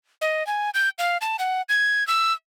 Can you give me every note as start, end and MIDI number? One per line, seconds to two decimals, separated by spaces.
0.21 0.46 75
0.47 0.70 80
0.74 0.89 91
0.99 1.17 77
1.21 1.37 81
1.39 1.62 78
1.69 2.06 92
2.07 2.33 88